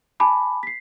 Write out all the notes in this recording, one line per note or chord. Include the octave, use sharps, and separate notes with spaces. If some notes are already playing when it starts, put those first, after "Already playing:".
G#5 A5 B5 D6
B6 C7